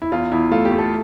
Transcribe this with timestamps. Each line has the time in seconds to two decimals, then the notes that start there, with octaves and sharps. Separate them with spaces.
0.02 E4
0.12 E2 F4
0.32 E2 E4
0.51 A3 F4
0.65 G4
0.72 A3
0.78 A4